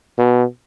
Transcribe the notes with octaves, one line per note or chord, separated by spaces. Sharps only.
B2